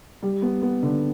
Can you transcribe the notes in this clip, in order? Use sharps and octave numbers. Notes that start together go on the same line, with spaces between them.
G3
B3
B3
D3